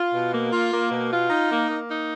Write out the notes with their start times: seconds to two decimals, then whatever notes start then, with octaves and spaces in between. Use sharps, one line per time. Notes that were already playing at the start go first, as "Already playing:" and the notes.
Already playing: F4
0.12 B2
0.32 A#3
0.52 F4
0.71 A#3
0.91 B2
1.11 F4
1.30 D#4
1.50 A#3
1.69 A#3
1.89 D#4